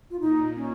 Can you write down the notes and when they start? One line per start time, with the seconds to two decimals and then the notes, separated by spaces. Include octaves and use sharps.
0.10 F4
0.20 A#2 D#4
0.55 C#4